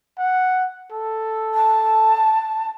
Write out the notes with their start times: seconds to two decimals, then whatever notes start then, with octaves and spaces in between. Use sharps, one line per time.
0.18 F#5
0.91 A4
1.54 A5